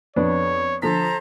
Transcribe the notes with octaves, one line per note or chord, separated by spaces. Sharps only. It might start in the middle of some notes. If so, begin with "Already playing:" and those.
F2 B3 D4 C#5
D3 F3 A4 C5 A#5 B6